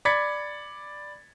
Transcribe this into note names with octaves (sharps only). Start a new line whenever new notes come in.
D5 B5 G#6 A6 B6 C#7